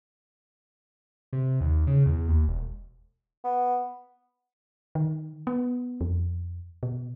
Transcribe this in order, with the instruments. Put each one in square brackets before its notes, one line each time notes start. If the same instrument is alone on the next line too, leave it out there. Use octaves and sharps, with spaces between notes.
[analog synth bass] C3
D#2
C#3
E2
D#2
E1
[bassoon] B3
[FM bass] D#3
B3
F2
B2